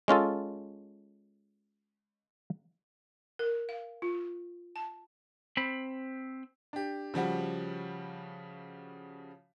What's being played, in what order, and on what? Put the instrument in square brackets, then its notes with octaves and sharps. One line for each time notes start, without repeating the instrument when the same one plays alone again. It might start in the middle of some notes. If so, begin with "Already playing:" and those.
[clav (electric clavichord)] G#3 C#4 F4 A4
[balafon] A#4
F5
F4
A5
[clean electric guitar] C4 B5
[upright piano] D4 G4
C#3 F3 G3 F#4